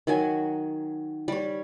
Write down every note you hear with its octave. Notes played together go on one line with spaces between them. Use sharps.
D#3 F#3 G#5
G3 C#5